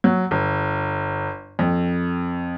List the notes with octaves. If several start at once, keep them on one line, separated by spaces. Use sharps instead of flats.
F#3
G1
F2